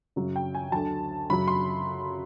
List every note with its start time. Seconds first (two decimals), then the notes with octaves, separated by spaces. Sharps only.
0.16 F#2 C#3 F#3
0.36 G5
0.55 G#5
0.72 D2 D3 F#3 A5
1.30 F#2 C#3 F#3 B5
1.48 C6